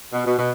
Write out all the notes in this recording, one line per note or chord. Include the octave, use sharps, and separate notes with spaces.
B2
B2
B2